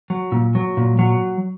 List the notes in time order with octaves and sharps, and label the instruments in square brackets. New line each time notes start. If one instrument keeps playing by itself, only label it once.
[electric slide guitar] F#3
A#2
F#3
A#2
F#3